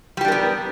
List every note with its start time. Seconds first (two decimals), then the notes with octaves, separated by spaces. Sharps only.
0.17 G3
0.21 G4
0.24 D4
0.28 A#4
0.32 B3